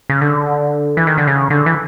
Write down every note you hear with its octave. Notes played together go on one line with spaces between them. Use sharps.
C#3
D3
E3
D#3
D3
C#3
D3
E3